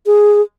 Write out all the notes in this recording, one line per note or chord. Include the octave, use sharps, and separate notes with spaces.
G#4